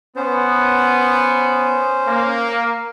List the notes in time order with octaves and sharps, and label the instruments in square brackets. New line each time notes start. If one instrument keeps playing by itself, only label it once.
[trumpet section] B3 [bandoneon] C#4 C5
[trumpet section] A#3